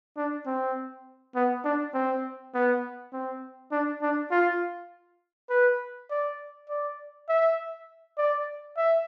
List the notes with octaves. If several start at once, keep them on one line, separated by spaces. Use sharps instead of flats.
D4
C4
B3
D4
C4
B3
C4
D4
D4
F4
B4
D5
D5
E5
D5
E5